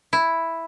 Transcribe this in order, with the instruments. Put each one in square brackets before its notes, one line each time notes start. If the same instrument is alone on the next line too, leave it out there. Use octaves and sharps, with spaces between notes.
[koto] E4